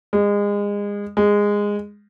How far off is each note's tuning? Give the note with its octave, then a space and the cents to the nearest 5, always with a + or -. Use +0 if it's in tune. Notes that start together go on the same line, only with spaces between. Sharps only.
G#3 -30
G#3 -15